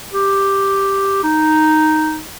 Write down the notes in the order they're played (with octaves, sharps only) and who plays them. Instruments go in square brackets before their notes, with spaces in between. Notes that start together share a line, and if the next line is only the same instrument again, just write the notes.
[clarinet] G4
D#4